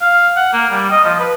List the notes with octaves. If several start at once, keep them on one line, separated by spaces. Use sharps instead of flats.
F5
F#5
A#3
G3
D#5
F3
B4